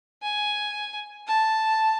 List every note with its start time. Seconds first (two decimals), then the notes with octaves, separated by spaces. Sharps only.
0.23 G#5
1.27 A5